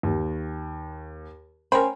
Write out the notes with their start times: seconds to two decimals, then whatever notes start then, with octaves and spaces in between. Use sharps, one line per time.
0.03 D#2
1.72 C#4 A#4 C5 G5 B5